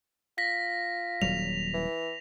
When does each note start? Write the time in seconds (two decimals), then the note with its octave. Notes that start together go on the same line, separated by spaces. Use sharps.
0.38 F4 A#6 B6
1.22 D#1 F#3 G3 F7
1.74 E3